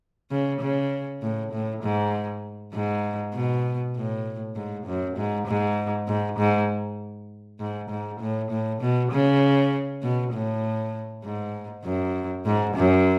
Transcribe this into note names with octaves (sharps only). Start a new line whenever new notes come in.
C#3
C#3
A2
A2
G#2
G#2
B2
A2
G#2
F#2
G#2
G#2
G#2
G#2
G#2
G#2
A2
A2
B2
C#3
B2
A2
G#2
F#2
G#2
F#2